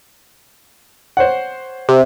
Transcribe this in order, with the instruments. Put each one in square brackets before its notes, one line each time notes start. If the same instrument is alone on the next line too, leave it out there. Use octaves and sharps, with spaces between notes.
[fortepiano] C5 C#5 F#5
[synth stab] C3